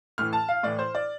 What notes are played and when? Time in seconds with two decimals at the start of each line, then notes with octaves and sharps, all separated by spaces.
0.18 A2 E3 F6
0.33 A5
0.49 F5
0.63 A2 E3 D5
0.79 C5
0.95 D5